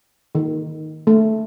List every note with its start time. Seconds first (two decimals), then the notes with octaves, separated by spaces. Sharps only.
0.35 D#3
1.07 A3